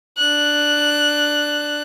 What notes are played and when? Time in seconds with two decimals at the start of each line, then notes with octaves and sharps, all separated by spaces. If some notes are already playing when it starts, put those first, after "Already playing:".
0.18 D4 F#6